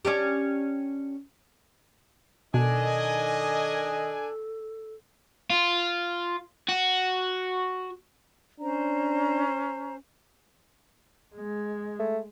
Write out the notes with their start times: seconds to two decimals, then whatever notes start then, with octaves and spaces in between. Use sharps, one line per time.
0.05 C#4 D4 G4
2.54 B2 D#3 D4 A4 D#5 G#5
5.50 F4
6.69 F#4
8.60 C#4 D4 C5 A#5
11.35 G#3
11.99 A3